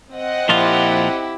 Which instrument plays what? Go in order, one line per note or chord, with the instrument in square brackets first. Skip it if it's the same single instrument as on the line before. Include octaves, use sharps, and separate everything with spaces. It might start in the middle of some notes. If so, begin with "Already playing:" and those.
[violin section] C4 D#5 F#5
[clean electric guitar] A#2 F3 F4 [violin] E4 G4